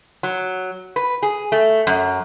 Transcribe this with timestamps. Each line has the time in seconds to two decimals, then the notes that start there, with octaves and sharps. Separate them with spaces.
0.23 F#3
0.96 B4
1.23 G#4
1.52 A3
1.87 F#2